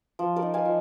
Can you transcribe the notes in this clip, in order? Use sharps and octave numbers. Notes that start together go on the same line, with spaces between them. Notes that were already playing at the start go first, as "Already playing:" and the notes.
F3
A#4 D5
D#4
F5 G#5
F3